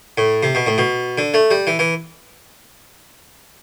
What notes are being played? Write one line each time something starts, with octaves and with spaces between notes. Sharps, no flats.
A2
C3
B2
A2
B2
D3
A3
G3
E3
E3